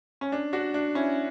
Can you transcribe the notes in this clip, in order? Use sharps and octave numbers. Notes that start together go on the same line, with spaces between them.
C#4
D4
D4 F#4
D4
C#4 E4